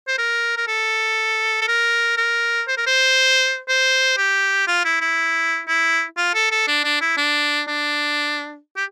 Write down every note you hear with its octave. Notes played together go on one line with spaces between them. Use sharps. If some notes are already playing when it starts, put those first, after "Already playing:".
C5
A#4
A#4
A4
A4
A#4
A#4
C5
A#4
C5
C5
G4
F4
E4
E4
E4
F4
A4
A4
D4
D4
E4
D4
D4
G4